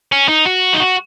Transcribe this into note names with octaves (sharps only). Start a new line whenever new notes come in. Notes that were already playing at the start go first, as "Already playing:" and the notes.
C#4
D#4
F#4
D#4
F#4